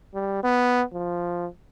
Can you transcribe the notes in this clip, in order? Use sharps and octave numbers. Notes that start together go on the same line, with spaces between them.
G3
B3
F3